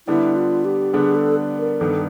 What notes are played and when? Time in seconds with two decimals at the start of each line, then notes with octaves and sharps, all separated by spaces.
0.07 D3 G3 B3 D4 E4
0.36 F4
0.65 G4
0.94 D3 G3 B3 D4 G#4
1.16 A4
1.59 A#4
1.81 G2 D#3 G3 B3 D4 A4